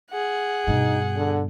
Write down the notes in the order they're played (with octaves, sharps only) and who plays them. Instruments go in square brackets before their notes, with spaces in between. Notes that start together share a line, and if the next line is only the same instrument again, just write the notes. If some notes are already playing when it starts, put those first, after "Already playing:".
[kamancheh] G#4 F#5
[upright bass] G2 B2 [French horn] D#4
[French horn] D3